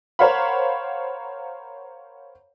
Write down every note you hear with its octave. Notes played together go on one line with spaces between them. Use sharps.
A#4 C5 C#5 F5 F#5 B5